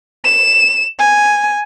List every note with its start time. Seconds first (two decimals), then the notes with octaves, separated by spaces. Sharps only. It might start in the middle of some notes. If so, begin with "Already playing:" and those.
0.24 E7
0.99 G#5